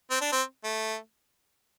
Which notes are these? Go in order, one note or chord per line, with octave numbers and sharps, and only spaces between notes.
C4
D4
C4
A3